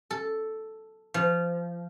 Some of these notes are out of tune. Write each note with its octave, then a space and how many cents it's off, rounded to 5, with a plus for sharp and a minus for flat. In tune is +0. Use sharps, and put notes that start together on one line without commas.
A4 +0
F3 -20